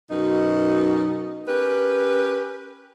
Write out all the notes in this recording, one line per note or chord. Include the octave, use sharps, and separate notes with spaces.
F#2 B2 D#4
C#4 G4 A#4 B4